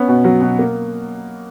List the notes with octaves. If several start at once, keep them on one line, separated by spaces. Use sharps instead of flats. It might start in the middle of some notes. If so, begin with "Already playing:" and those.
Already playing: B3 C#4
B2
F#3
B2
A#3